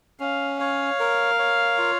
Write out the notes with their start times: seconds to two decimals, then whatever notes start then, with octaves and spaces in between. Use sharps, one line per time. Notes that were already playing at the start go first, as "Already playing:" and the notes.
0.20 C#4 F5
0.60 C#5 F5
1.00 A#4
1.39 C#5
1.78 F4